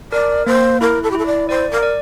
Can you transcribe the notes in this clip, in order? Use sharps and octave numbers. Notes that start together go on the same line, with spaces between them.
A#4 D5
A#3 C5
E4 A#4
A4
G4
E4 A4
D5
C5 D5
A#4
D5